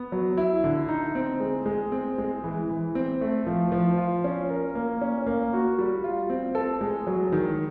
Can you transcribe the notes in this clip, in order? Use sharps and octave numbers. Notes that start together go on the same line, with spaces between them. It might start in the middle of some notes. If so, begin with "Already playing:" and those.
Already playing: B3
F#3
E4
D3
D#4
C4
G#3
G#3
C4
G#3
E3
E3
C4
A3
F3
F3
F4
C#4
A#4
A#3
C#4
A#3
F#4
G3
F4
C4
A4
G#3
F#3
D#3